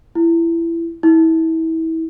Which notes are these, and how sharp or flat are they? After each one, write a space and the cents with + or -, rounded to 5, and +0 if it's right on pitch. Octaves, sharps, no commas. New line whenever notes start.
E4 +20
E4 -30